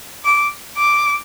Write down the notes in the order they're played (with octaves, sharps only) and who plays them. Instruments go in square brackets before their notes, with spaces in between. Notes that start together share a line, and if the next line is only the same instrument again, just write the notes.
[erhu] D6
D6